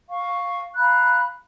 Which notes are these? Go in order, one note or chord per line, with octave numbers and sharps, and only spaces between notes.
F5 C#6
F5 A#5 B5 F#6